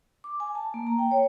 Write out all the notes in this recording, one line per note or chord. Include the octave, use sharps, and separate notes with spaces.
D6
G#5
A5
A#3
A#5
G5
C#5